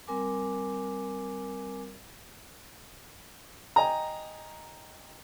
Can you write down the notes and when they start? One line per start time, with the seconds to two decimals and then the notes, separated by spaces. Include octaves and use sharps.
0.08 G3 C4 A#4 G#5 D6
3.76 D#5 G5 G#5 A#5